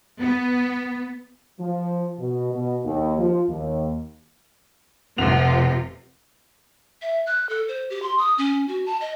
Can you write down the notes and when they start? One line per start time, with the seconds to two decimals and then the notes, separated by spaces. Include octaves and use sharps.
0.19 B3
1.60 F3
2.19 B2
2.53 B2
2.85 D#2
3.19 F3
3.49 D#2
5.18 F1 C3 F3 F4 F#5 F7
7.02 E5
7.27 F#6
7.49 A4
7.68 C5
7.90 G4
8.02 C6
8.18 D#6
8.38 C#4
8.68 F#4
8.86 A5
9.01 D#5